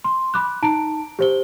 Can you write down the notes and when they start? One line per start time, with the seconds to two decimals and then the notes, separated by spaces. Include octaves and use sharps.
0.04 C6
0.34 B5 D6 F#6
0.62 D#4 A5 A#5 D7
1.19 G4 C5 G7